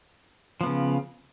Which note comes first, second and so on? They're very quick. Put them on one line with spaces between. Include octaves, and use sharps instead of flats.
F3 B3 C#3